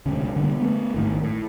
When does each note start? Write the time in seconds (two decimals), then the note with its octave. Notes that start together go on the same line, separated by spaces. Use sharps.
0.06 E1 D2 C#3
0.36 D3 G3 A#3
0.60 A3 B3
0.94 G#1 A2 C3 D#3
1.23 A2